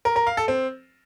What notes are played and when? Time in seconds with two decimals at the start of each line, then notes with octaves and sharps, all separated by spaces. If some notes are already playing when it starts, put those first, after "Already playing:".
0.05 A#4
0.16 A#4
0.27 F5
0.37 A4
0.48 C4